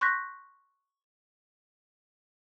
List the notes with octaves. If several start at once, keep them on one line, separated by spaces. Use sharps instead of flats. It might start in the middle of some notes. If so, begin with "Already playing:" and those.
C6 C#6 F#6 G6 A#6 B6